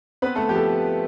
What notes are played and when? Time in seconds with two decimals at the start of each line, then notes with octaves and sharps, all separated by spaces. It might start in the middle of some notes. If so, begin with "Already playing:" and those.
0.22 B3 C4 B4
0.36 A3 A4
0.49 F3 G4
0.56 A4